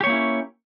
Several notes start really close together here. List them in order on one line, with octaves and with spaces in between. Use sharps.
G4 C#5 A#3 E4 C#4